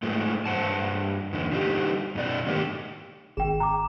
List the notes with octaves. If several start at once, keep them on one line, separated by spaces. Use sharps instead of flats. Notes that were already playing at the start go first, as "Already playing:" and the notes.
G#2 F3 G#3 A3
G2 C5 F#5 A5
E2 D3
D3 F3 G3 D#4 G4
F#2 B2 D#4 D5
A2 D3 D#3 G#3 G4 A#4
G#1 G#4 G5 E7
A#5 D6